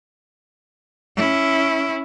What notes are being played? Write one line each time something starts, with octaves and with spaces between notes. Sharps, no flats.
C#4 E4